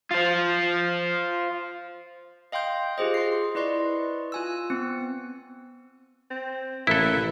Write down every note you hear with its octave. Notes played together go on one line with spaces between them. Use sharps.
F4 C5
D#5 F5 G5 C6 G6
F4 G4 G#4 C5 D#5
C6 C7
E4 B4 D5 D#5 C6 C#6
F4 G#5 E6
B3 C4
C4
A1 A#3 E4 A4 B4 E5